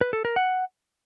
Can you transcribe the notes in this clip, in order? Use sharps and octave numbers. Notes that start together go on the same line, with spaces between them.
B4
A4
A#4
F#5